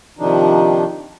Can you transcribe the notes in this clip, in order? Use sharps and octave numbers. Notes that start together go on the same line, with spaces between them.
C3 D#3 F3 D4 D#4